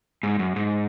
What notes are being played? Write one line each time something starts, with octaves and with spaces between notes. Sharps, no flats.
G#2
F#2
G#2